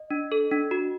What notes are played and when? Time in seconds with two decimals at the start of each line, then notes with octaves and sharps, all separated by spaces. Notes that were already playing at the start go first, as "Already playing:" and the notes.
Already playing: D#5
0.11 D4
0.32 A4
0.51 D4
0.71 F#4